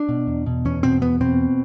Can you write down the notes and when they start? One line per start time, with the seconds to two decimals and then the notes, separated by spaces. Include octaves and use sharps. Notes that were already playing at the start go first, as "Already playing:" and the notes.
Already playing: D4
0.09 B2
0.27 E2
0.46 B2
0.65 E2 C#4
0.83 B2 C4
1.02 E2 B3
1.21 B2 C4